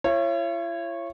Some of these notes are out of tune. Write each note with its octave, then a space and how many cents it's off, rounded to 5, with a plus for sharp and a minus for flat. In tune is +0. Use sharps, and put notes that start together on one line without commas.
E4 +45 C#5 -20